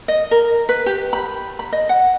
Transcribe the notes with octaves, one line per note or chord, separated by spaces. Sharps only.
D#5
A#4
B4
G4
B5
B5
D#5
F#5